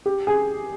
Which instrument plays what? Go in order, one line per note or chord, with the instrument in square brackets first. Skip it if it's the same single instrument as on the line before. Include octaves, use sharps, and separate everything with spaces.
[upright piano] G4
G#4